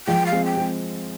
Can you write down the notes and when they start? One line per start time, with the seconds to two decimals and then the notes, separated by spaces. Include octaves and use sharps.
0.07 F3 G#3 G5
0.27 F5
0.32 G#3 C4
0.45 G5
0.57 G#3 C4